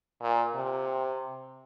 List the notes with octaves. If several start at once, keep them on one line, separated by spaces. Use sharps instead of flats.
A#2
C3